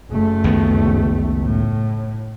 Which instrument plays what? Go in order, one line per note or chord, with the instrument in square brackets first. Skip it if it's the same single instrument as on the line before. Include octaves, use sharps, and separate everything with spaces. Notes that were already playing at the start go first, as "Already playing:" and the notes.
[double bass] F#1 A3
[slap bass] C#2 D#3 B3
[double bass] A2